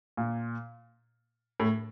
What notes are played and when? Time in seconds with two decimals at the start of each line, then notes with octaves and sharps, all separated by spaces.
0.17 A#2
1.60 A2